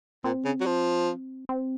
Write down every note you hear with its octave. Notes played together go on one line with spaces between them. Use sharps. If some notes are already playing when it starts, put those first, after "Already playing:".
A#2 C4
C#3
F#3
F3
C4